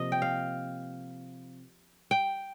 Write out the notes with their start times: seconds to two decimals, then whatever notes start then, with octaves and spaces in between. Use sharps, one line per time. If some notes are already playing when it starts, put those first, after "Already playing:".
Already playing: C3 F3 A#3 D#5
0.12 G5
0.22 F5
2.11 G5